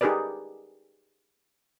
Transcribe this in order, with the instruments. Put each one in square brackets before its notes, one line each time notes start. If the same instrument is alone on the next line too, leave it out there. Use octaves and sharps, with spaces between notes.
[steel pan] D#4 G4 G#4 A#4 B4 D5